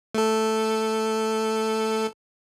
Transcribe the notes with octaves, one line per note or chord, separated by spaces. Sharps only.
A3 A4